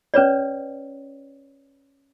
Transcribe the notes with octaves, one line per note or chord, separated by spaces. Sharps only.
C#4 B4 C#5 D5